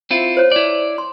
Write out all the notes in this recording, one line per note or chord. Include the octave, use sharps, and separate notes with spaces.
C4 E4 F4
C5 C#5
E4 D5
C6